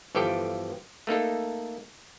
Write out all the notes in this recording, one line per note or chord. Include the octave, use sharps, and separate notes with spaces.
G1 E3 F3 G4 A4 G5
A3 A#3 D#4 A4